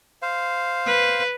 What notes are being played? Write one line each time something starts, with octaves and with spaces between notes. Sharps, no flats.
C5 F5
B4